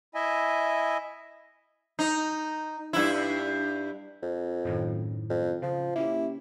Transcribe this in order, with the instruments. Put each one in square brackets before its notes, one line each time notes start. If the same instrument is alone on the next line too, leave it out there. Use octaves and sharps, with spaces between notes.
[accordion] E4 D#5 E5 G#5
[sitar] D#4
G2 E4
[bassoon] F2
[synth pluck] F#2 A2 D#3
[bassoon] F2
[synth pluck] C#3 [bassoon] F3
[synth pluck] A#3 C#4 G4 [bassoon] E4